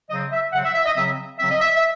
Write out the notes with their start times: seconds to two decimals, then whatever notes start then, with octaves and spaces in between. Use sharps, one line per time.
0.10 C#3 F#3 C4 D#5
0.31 E5
0.52 C#3 F#3 C4 F#5
0.64 E5
0.74 E5
0.85 D#5
0.96 C#3 F#3 C4 E5
1.39 C#3 F#3 C4 E5
1.50 D#5
1.61 E5
1.75 E5